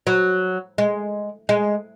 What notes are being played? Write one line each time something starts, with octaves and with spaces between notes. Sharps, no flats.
F#3
G#3
G#3